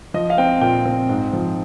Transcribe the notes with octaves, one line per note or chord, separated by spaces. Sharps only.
F3 D#5
F5
C4 G5
A#2 G5
C4
G#2
F3